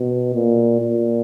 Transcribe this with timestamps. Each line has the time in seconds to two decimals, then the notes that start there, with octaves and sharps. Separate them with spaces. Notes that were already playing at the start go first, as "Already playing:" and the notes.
Already playing: B2
0.34 A#2
0.80 A#2